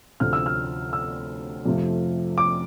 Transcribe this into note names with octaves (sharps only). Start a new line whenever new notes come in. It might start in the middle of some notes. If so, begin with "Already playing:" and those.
D2 C3 F3 F6
E6
F6
E6
F2 C3 F3 A3
D6